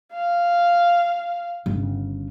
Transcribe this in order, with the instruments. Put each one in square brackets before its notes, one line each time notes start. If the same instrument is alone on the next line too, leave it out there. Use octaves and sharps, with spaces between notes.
[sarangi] F5
[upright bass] G1 C#3